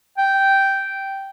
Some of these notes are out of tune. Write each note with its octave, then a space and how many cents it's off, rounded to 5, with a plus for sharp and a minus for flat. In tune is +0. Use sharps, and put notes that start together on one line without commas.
G5 -5